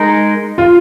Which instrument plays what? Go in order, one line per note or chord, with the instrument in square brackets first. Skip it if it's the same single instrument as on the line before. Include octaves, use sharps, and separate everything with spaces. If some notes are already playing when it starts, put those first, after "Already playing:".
Already playing: [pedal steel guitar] G#3 D#4 A#4
[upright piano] F4